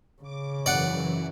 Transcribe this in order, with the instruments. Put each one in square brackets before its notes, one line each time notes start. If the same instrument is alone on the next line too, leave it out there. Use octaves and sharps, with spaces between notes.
[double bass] C#3 [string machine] D6
[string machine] F#2 E3 [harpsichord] D5 F#5